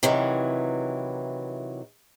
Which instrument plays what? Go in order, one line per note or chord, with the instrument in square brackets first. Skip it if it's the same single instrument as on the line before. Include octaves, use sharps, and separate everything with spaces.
[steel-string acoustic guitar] C3 D#3 E3 F#3